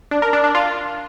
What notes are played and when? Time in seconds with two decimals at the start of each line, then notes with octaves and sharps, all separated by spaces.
0.11 D4
0.22 A#4
0.33 D4
0.44 D4
0.55 F4